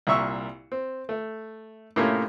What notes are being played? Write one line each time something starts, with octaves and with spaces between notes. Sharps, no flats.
C2 A#2 E5 C#6 E6
C4
A3
A2 C3 A3 A#3 C#4 F4